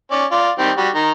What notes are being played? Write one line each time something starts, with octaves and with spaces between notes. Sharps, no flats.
C#4 D5
F4 D5
D#3 G3 C4
G3 F#4
D#3 A#5